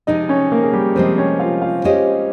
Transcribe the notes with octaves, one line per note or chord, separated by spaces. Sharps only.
C3 F3 G#3 D#4 D#5
C#4 C#5
A#3 A#4
G#4
G3 G4
C3 F3 G#3 C4 C5
C#4 C#5
F4 F5
F4 F5
G#3 C#4 G4 C5 D#5